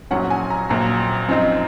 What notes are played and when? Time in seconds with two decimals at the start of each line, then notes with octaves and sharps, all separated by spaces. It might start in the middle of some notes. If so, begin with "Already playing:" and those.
0.11 A#1 A#2 F#3 C#4 F#5
0.30 G#5
0.50 A#5
0.69 A#1 A#2 F#3 A#3 A#5
1.28 F#2 F3 C4 D#4